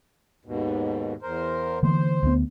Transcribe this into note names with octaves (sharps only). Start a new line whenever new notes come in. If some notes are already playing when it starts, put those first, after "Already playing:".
D#2 G#2 B2
E2 A#4 C5
D3 E3 A#3 C5
D2 B3